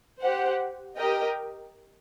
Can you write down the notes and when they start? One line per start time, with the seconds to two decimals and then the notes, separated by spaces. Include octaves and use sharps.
0.21 G4 C5 F#5
0.96 G4 A#4 D#5 G5